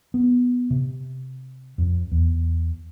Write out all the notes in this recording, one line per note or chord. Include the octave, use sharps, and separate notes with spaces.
B3
C3
F2
E2